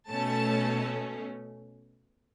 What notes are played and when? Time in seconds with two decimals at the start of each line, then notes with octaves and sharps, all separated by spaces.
0.10 B2 A3 C#4 A5